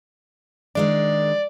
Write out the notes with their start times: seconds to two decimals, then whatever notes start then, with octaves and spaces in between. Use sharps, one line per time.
0.75 D#3 G#3 D4 D5